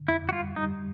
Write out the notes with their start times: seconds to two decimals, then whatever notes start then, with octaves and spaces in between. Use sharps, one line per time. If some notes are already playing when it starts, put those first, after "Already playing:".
Already playing: D3
0.08 F2 E4
0.29 F#4
0.32 G3 F4
0.56 G3 D#4